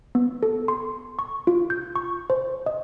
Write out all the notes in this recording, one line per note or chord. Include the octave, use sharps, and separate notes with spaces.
B3
A4
C6
C#6
F4
G6
C#6
C5
D#5